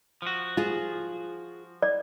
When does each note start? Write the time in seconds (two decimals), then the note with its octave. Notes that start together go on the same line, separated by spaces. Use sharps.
0.22 F3 F#4
0.57 F4 G#4
1.82 D5